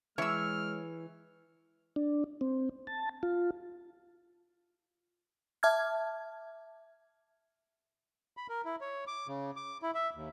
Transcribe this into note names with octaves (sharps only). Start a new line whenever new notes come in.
E3 G#3 C#5 E6 F6
D4
C4
A5
F4
E5 A5 D6 F6 G#6
B5
A#4
E4
C#5
D6
C#3
D6
E4
E5
D#2